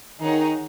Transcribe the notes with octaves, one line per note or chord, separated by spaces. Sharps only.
D#3 D#4 G#4 C#5 F#5